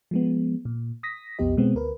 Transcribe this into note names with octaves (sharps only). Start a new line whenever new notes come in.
F3 G#3 B3
A#2
D#6 A#6 B6
B1 F2 B3 G4 D#5
B2 G#3 B3 C4
D2 A#4 B4